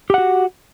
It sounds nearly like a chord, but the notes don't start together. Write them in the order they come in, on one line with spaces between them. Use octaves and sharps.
G4 F#5 F#4